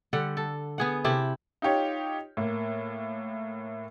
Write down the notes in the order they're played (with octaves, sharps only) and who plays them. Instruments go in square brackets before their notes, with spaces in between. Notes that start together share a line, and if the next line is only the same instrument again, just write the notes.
[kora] D3 G3 F#5
A4
B3 G#4 F#5
C3 E4 G4 A4
[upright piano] D#4 F4 G4 C#5
A2 A#3